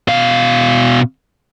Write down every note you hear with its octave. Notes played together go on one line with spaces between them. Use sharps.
B2 F5